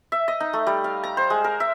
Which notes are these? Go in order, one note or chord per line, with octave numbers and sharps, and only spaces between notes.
E5
D#5
D#4
A3
G3
F5
A#5
C5
G#3
A#4
E5